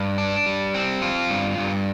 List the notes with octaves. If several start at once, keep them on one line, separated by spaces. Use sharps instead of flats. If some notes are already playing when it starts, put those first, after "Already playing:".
Already playing: G2
D4
G3
C4
F4
G2
G2